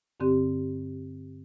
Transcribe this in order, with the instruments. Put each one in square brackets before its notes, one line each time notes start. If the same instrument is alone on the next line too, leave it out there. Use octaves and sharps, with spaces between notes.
[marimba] G2 D3 C4 G4